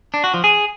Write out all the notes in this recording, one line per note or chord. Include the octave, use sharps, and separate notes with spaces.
D4
F#4
F3
G#4